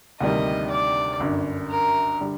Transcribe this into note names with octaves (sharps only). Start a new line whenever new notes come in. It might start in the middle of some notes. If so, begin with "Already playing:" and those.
D2 C3 D#3 G3 A#3 D#5
D5
G1 F#2 D3
A#4
D3 G3